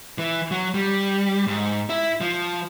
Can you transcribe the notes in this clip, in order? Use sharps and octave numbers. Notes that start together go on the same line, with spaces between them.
E3
F#3
G3
G#2
E4
F3